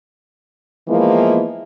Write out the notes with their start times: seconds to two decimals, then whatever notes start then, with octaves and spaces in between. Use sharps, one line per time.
0.89 E3 F3 G#3 A#3 B3 E4